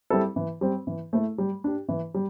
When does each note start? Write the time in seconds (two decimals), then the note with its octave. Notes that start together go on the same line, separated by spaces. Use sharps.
0.10 G3 C4 E4 A4
0.36 E3
0.61 G3 C4
0.87 E3
1.13 A3 E4 A4
1.38 G3
1.64 D4 G4
1.89 E3
2.14 G3